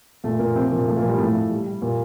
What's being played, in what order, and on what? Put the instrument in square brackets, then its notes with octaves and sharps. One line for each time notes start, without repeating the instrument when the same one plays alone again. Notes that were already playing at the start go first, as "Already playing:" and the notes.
[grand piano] A#2 A3
A#2 A#3
C3 F3 C4
A#2 F3 A#3
F3 A3
A#2 A#3
F3
G3
A2 A3
A2
G3
G3
A#2 A#3